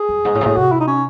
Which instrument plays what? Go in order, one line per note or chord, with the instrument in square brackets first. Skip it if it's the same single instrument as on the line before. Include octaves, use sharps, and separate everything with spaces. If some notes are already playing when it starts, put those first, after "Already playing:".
Already playing: [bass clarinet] G#4
[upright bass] F#2
G#2
A2
C3
A2
[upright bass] C3 [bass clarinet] F#4
[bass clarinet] E4
D#4
C#4